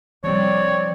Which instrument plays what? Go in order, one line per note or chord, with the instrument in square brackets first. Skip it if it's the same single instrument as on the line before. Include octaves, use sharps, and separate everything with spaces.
[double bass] C3 G3 [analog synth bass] F3 [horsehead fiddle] C4 D5 [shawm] C#5